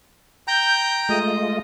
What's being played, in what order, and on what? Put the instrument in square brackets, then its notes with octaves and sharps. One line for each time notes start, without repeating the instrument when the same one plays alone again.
[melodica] G5 A#5 [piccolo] G6
[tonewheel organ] G#3 A3 F4 [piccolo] D#5